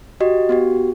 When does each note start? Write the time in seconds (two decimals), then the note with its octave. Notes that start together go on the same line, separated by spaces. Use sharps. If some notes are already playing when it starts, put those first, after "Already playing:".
0.20 F#4 G4 D#5
0.49 B3 F#4 G4